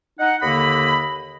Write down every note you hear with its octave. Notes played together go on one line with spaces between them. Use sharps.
D#4 F#5
D#2 D3 A#3 D#5 B5